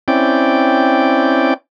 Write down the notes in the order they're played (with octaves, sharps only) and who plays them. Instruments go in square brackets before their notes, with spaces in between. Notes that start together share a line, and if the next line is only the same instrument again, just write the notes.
[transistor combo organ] C4 C#4 E4 D5 G5